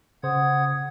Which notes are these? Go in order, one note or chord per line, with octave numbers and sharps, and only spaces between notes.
C#3 C5 F#5 D#6 G#6